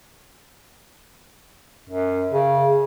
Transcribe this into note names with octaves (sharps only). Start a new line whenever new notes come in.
F#2
C#3